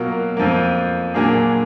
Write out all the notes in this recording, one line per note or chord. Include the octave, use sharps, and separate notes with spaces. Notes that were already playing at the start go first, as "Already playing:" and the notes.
Already playing: B2 F#3 A#3 F4 A#4
F2 F3 A#3
A#2 F#3 A#3 D4 G#4